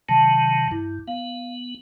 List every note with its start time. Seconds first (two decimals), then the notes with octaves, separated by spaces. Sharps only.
0.09 C3 D#3 F#3 A5
0.71 G2 E4
1.08 B3 F5